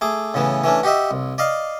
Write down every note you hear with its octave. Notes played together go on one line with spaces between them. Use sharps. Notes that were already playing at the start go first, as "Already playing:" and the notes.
A3 G#4 D6
A2 C#3 E3 B3
E3 A3 C#4 D4
F#4 G4 D#5 E5
C2
D5 D#5 F5